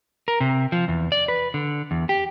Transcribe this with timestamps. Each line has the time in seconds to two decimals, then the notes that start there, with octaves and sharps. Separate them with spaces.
0.28 A#4
0.40 C3
0.72 F3
0.88 E2
1.12 D5
1.28 B4
1.54 D3
1.91 E2
2.09 G4